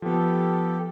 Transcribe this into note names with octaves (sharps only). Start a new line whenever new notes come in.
F3 B3 G4 A4